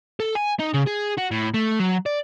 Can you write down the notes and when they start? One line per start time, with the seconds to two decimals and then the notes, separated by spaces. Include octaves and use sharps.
0.20 A4
0.35 G#5
0.59 D#4
0.73 C#3
0.86 G#4
1.17 F#4
1.31 A2
1.54 A3
1.80 F#3
2.06 D5